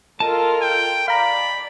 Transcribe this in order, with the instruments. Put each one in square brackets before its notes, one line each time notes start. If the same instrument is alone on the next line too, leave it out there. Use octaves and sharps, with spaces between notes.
[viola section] F4 A4 A#4 [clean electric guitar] D#5 A5
[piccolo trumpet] G5
[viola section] D5 [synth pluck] F5 A#5 [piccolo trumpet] B5